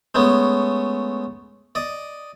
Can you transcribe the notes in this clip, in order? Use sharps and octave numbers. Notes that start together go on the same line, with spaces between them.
G#3 A3 B3 C#4
D5 D#5